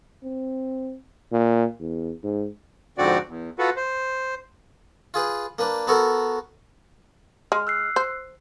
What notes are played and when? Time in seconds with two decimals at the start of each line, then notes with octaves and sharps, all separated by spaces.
0.24 C4
1.32 A#2
1.80 E2
2.23 G#2
2.98 F2 G#2 D3 C4 F#4 D5
3.28 E2
3.59 F4 F#4 A4 B4
3.76 C5
5.14 F4 G#4 B4
5.59 A#3 D4 B4
5.87 B3 F#4 A4 A#4
7.52 G#3 F6
7.67 E6 F#6 C7
7.96 C5